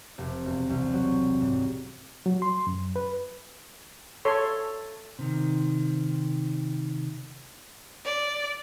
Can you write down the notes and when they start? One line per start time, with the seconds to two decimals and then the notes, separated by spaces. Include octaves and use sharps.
0.18 F1
0.45 E1
0.69 C2
0.92 F#3
1.41 G#2
2.26 F#3
2.42 C6
2.67 F#2
2.96 B4
4.25 A4 C#5 C6
5.19 C3 D#3
8.05 D5